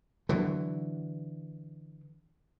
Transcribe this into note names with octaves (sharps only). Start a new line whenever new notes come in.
D3 E3 F#3